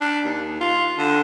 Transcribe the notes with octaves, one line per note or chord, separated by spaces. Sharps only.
D4
D#2
F4
D3